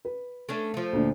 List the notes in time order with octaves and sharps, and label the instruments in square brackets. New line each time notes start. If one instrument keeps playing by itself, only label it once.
[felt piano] B4
[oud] A3 C#4 D4
F3 A3
[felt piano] D2 A#2 D4